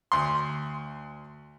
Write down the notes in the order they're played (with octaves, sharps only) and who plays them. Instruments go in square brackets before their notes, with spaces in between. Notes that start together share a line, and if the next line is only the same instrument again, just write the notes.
[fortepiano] D2 C6